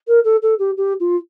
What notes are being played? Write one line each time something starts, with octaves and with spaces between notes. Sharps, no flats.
A#4
A4
A4
G4
G4
F4